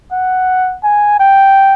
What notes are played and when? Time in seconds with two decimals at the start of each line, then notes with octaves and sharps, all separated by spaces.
0.12 F#5
0.84 G#5
1.20 G5